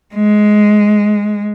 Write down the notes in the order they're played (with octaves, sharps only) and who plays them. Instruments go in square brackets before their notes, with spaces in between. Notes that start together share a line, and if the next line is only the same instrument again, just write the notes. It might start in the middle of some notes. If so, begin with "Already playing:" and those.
[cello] G#3